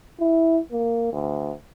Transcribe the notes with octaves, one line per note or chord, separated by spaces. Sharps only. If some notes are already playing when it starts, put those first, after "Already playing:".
E4
A#3
D2